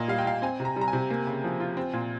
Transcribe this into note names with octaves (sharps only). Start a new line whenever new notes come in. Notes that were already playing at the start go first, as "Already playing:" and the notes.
Already playing: A#2 A#3 D#5
G3 F5
G5
A#2 F5
C4 G#5
C3
A#5
G3
A#5
G#5
C3
A#3
C#3
F3
F4
C4
A#2